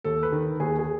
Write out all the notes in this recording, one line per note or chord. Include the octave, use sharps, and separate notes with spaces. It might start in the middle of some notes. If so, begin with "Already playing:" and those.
D#2 A4
B4
D#3
D#2 G#4
G#4